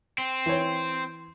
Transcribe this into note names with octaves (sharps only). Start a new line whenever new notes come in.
C4
E3 C#5